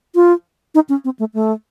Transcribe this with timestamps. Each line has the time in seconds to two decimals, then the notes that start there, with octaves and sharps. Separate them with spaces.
0.15 F4
0.75 D#4
0.89 C#4
1.05 C4
1.19 A3
1.34 A3